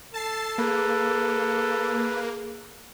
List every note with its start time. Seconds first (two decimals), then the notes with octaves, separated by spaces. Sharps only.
0.14 A4 A5 A6 C7
0.58 A#3 G#4 B4